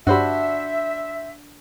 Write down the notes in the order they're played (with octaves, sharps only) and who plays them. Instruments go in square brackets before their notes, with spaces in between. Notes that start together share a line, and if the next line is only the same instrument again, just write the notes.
[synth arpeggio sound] G2 G4 [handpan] D4 [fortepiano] F#4 C5 B5 [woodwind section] E5